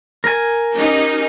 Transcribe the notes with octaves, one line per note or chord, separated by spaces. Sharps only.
A#4 G#5
C#4 D#4 G4